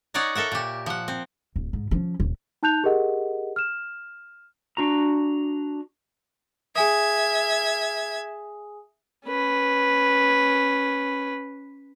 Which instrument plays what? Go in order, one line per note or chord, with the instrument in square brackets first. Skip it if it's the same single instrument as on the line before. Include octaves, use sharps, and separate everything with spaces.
[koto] D#4 C#5 D5 F#5 G#5 A#5
A4 A#4 E5 F#5
A#2 G4
F3 F#5
C4
[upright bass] D1
G#2
F3 C#4
D#1
[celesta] D#4 A5 F#6 G6 F7
G4 G#4 A#4 D#5 F#5
F6 E7
[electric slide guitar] D4 F#4 A#5
[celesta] G#4 G#5 D#6 [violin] E5 G#6
[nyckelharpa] C#4 B4